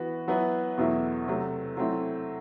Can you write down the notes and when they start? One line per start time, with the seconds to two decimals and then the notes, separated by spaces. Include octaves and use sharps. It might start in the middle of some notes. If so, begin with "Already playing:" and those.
Already playing: E3 B3 F#4 B4
0.28 F#3 B3 E4 B4
0.77 E2 B2 F#3 A3 E4
1.28 C3 F#3 A3
1.77 F#3 A3 C4 E4